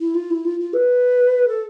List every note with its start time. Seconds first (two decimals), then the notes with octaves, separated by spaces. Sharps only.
0.01 E4
0.15 F4
0.31 E4
0.45 F4
0.60 F4
0.73 B4
1.48 A4